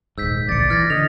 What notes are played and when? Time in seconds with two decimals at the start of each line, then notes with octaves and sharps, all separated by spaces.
0.18 D#1 G#2 E6 G6 B6
0.49 D1 A#1 D5 A6 C#7
0.70 E3 F6 G#6 A#6
0.90 D3 D#5 F7